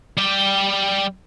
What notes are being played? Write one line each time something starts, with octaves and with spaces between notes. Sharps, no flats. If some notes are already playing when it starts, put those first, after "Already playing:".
G3 G4